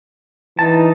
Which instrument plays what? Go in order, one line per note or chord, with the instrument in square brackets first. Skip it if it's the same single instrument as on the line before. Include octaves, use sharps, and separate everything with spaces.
[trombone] E3 [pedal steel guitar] D#4 A5